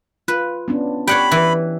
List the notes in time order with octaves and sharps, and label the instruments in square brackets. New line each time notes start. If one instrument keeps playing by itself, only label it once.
[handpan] F4 [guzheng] B4
[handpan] B3 C#4 D4
[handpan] G4 D5 [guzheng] C#5 F#5 G5 [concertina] B5
[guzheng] E3 [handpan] E5